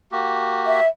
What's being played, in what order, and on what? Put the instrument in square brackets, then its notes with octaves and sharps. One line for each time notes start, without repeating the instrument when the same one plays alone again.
[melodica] A#3 F#4 G4
[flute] E5